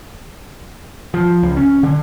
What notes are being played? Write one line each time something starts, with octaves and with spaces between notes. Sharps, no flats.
F3
C#2
C#4
D3